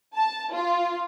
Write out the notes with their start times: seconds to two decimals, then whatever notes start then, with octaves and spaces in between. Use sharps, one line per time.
0.14 A5
0.52 F4